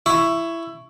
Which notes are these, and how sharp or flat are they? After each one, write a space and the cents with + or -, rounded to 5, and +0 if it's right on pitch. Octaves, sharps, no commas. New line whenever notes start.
E4 +15 C#6 +0